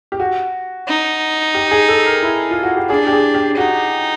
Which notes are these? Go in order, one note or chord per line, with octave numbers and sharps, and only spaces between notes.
G4
F#4
D#4
G4
G#4
A4
A#4
E4
F4
F#4
G4
D4 G#4
G4
G#4
G4
D#4 F#4